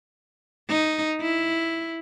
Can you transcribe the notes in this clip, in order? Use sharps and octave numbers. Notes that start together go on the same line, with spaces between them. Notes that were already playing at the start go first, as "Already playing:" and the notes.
D#4
E4